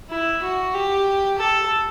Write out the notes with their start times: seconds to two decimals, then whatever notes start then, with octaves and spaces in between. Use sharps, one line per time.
0.10 E4
0.43 F#4
0.74 G4
1.38 A4